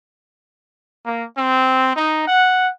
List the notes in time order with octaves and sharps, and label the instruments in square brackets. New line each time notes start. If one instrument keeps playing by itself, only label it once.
[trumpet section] A#3
C4
D#4
F#5